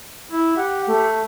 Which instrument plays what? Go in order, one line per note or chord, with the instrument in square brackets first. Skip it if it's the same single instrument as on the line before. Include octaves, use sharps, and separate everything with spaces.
[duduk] E4
[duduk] G4 [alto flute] F#5
[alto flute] A3